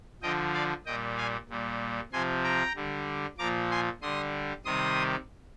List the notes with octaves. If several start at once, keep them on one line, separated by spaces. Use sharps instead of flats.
D3 F3 D#5 G5
D5 F5
A#2 G3 D#5 G5
F5 G#5
A#2 G3
C3 F3 G#5 C6
G5 A#5
D3 G3
A#2 F3 A#5 D6
G#5 C6
D3 G3 C6 D#6
C3 D#3 G3 C6 D#6